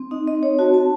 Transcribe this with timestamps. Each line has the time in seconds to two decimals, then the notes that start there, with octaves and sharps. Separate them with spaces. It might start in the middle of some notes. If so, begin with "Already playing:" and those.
Already playing: C4
0.11 D#4 D#5
0.27 D#5
0.35 C4
0.43 C#5
0.59 F#4 A5
0.74 A5